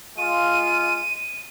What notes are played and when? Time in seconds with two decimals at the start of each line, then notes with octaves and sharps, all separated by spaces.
0.17 G#3 F4 D#7